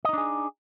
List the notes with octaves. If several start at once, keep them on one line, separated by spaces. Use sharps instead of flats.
D4 D#4 G#4 D#5